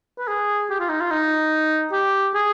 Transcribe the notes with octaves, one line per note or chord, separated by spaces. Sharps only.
B4
G#4
G4
F4
D#4
F4
D#4
G4
G#4